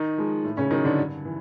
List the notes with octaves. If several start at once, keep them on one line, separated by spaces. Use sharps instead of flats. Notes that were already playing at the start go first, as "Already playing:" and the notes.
Already playing: D#3 D#4
F3 G#3
A2
C#3 C#4
D#3 F#3 D#4
D3 D4
G2
E3